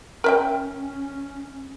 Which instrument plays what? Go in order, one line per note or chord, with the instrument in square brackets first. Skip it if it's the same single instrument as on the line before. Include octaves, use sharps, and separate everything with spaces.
[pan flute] C#4 [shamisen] A#4 E5 G5